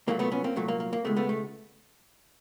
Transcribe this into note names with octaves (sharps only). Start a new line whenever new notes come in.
C2 A#2 F#3 A3 A#3
A3 B3
B3 C#4
A#3 C4
C2 A#2 F#3 A3
A#3
A#3
A#3
C#2 B2 G#3 A3
A3 B3
A3